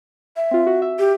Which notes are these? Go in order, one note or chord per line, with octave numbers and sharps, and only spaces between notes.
E5
C4 F4
F#4
E5
G4